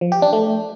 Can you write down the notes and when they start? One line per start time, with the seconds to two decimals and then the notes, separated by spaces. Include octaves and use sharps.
0.01 F3
0.12 G4
0.22 D4
0.33 A3